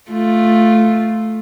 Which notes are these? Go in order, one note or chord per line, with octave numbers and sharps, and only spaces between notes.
A3 F4